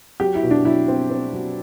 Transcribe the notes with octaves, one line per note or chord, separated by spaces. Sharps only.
F#3 G4
E4
B2
D4
F#3 E4
C4
C4
F#3